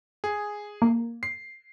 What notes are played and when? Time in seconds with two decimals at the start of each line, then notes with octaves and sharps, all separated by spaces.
0.24 G#4
0.82 A#3
1.23 C7